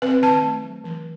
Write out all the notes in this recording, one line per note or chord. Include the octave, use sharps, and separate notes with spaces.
C4 B4
D#3 A5
A3
F#3
E3